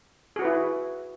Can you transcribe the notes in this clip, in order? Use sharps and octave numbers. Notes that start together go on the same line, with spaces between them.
E4 F#4 G#4 B4